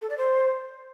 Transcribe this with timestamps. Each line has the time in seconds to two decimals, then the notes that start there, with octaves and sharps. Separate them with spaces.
0.02 A4
0.10 D5
0.18 C5